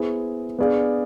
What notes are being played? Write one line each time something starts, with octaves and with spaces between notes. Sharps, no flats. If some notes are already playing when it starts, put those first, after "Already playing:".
Already playing: B3 E4 G#4 C5
B3 D4 G#4 D5 F5